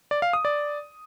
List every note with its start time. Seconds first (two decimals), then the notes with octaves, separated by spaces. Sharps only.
0.11 D5
0.22 F5
0.33 D#6
0.45 D5